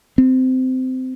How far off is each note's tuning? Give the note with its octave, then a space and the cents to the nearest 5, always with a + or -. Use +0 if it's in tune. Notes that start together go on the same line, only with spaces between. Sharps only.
C4 -20